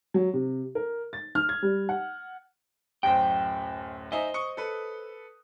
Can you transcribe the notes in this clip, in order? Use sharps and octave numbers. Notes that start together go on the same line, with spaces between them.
F#3
C3
A#4
A6
F6
G#6
G3
F#5
D1 F#2 C5 G5
D#4 C5 D#5 E5 G#5
C#6 D#6 C#7
A4 B4